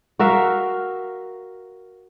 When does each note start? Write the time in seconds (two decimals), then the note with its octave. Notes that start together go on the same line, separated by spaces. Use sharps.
0.19 F#4 A#4 E5 F5